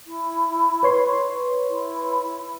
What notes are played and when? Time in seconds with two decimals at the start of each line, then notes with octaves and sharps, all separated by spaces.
0.07 E4
0.83 B4 C#5 C6
1.70 E4